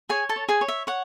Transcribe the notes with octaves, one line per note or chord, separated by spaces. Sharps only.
G#4 C#5 G#5
A4 A5
C#5
G#4 G#5
C#5
E5
C#5 F#5